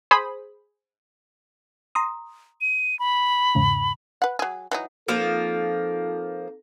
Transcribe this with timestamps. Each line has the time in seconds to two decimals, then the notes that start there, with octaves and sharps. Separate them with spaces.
0.11 G#4 C5 B5 D#6
1.95 A#5 C6 D#6
2.61 D#7
2.99 B5
3.55 E2 G#2 C#3
4.22 B4 F#5
4.39 F#3 G#4
4.71 E3 F#3 D#4
5.08 F3 A#3 C4 D#4 A4